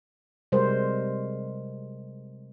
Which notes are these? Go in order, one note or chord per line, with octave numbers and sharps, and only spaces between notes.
C3 G3 G#3 A#4 C5